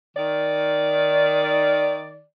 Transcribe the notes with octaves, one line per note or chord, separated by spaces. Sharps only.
D#3 D5